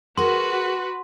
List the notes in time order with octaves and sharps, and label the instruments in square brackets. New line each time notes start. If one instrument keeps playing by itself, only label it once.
[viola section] F#4 B4 [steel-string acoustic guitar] G#4 A#4 [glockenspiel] C6